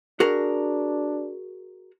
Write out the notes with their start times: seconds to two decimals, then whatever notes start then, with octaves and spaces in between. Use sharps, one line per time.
0.20 D4 F#4 G#4 A#4